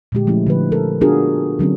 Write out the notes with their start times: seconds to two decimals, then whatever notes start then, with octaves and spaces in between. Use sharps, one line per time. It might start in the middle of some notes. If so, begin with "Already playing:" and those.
0.12 A#2 D3 G#3 G4
0.27 F3 A3 C#4 E4
0.47 D3 F3 B4
0.72 A4 A#4
1.01 B3 D4 F4 F#4 G#4 A#4
1.59 D3 F#3 C4 C#4